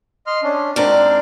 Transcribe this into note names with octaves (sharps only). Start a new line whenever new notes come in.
D#5 C6 F6
C#4 D4
G#2 C4 D4 A#4